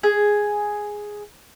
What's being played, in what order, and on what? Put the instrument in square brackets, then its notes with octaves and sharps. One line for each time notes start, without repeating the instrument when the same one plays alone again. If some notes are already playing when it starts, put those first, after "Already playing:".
[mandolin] G#4